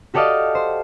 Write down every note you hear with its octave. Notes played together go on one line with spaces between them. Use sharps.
F#4 G4 A4 D5 D#5 F5
C5